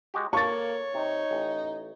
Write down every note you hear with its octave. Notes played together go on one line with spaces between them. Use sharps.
G#3 F#4 G4
A#3 A4 C#5 F5 C#6 A6
C3 D#4
A1